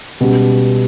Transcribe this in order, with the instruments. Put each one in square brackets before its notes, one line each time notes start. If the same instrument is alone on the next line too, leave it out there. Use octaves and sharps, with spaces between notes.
[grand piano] C#2 B2 G3